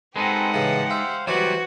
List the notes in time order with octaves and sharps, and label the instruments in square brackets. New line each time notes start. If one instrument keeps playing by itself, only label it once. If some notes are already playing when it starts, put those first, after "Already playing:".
[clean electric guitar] G#3 D#4 [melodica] C4 A4 B4 [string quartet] G4 F#5
[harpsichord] A2 C#3 E3 [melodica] A5
[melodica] C5 F5 [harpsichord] E5 A5
[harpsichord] E3 C5 B5 [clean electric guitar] F#3 G3 [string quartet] F#4 [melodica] D5